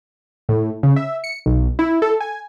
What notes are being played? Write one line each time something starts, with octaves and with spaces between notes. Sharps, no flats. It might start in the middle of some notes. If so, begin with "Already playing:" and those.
A2
C#3
E5
C#7
B1
E4
A4
G#5